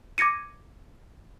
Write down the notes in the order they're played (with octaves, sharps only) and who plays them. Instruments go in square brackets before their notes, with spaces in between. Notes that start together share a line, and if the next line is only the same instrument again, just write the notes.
[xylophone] D6 G#6 A#6 C#7 D#7